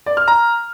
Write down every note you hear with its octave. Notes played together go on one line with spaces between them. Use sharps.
D5
F6
A#5